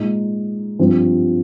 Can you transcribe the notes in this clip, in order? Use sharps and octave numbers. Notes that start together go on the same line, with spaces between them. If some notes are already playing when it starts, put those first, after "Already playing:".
Already playing: A#2 G#3 D#4
G2 F3 C4